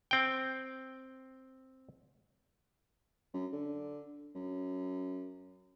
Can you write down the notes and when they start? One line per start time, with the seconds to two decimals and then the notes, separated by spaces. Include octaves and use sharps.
0.11 C4 G5
3.33 F#2
3.52 D3
4.35 F#2